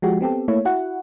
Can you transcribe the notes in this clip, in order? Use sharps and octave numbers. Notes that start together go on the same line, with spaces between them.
F3 G#3 F#4 G4
B3 C4 G4 A4
A3 A#3 E4 C#5
E4 F#4 F#5